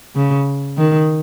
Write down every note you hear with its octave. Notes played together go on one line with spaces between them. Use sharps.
C#3
D#3